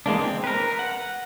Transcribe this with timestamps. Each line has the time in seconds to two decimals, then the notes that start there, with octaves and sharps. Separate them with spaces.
0.06 E3 G#3 A#3 D4
0.19 C4
0.44 A#4 B4
0.79 F#5